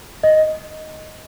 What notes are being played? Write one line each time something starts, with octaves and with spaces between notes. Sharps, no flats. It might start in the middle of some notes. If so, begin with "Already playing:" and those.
D#5